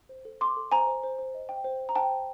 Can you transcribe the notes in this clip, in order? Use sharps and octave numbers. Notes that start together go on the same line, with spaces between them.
C5
A4
A4 C6 D6
A4
C5 G#5 A#5
C5
C5
C5
D#5
G5
C5
C5
A#5
C5 G5 A5
C5